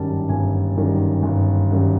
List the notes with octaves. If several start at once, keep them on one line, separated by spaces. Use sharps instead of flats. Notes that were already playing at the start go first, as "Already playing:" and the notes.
Already playing: G1 F#2 D#3 G3 A5
G1 G#5
F#2 D#3 G3
G1
F#2 D#3 G3